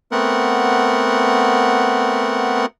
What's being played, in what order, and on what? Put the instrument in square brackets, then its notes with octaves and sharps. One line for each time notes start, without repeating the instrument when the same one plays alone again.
[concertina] A3 B3 C4 A#4 F#5